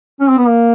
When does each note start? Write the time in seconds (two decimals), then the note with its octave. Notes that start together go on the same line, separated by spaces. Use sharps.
0.20 C#4
0.29 C4
0.38 B3
0.47 A#3